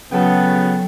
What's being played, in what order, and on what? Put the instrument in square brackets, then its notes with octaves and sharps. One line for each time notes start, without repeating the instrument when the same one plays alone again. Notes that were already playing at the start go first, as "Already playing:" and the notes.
[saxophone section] C#3 B3 [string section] F#3 [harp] A4 G5